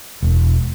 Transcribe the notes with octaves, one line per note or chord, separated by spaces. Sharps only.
E1